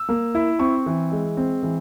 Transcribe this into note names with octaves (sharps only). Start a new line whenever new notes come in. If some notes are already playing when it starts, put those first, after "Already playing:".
Already playing: E6
A#3
E4
C4 C#6
E3
G#3
C4
E3